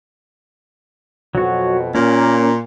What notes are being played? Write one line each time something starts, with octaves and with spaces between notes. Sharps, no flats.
F2 B2 F#3 F#4
A#2 A#3 C#4